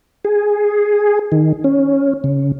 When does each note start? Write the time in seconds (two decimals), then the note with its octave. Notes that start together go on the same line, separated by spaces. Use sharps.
0.25 G#4
1.32 D#3
1.64 C#4
2.24 C#3